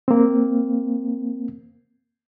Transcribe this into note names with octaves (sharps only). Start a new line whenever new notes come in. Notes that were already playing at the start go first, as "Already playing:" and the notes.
A#3 C4